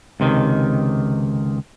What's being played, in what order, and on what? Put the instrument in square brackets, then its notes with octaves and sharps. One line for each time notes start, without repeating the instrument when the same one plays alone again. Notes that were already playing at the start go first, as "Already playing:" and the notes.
[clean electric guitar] C#2 C3 D#3